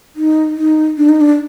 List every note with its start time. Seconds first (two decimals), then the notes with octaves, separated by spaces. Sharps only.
0.16 D#4
0.56 D#4
0.98 D4
1.09 D#4
1.21 D4